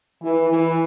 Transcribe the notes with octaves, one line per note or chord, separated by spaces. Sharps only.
E3
E3